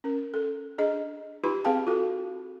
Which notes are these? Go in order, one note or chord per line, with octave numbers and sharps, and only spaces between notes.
C#4 A#4
A4
D4 G#4 D#5
D#4 F4 G4 B4 B5
C4 G#4 B4 F5 G5 A5
F4 F#4 A4